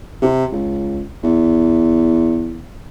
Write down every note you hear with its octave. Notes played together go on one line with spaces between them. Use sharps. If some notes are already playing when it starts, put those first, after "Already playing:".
C3
C#2
E2